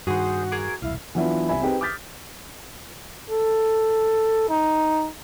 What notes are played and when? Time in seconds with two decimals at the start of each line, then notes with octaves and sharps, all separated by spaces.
0.07 G2 D#3 F#4 G#4 C5 F#5
0.52 G#4 A#4 D6
0.82 E1 C2 E4 F5
1.15 E3 F#3 B3 D4 E4 F4
1.49 C2 E5 G#5 B5
1.62 C4 D#4 G4 G#4 B4
1.81 D6 D#6 F6 G6 A6 B6
3.30 A4
4.49 D#4